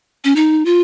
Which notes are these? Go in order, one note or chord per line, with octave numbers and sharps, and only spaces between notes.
C#4
D#4
F4